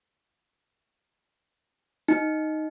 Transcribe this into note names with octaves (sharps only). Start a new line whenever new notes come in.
D#4